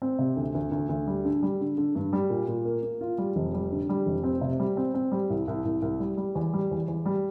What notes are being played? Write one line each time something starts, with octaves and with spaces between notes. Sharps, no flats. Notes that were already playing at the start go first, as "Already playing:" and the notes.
C4
C3
D2
D2
D2
D2
G3
D3
G3
D3
D3
G2
G3
A#2
A#2
A#3
A#3
F4
G3
F1
G3
D3
G3
F1
C4
C3
G3
C4
C4
G3
C2
C2
C2
C2
G3
G3
E2
G3
E2
E2
G3